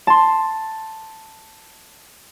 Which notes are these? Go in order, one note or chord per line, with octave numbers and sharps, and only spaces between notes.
A5 C6